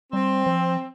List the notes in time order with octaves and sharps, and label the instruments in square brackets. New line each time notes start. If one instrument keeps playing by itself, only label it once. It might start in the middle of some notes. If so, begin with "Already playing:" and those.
[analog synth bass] G3 [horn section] C4
[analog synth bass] F3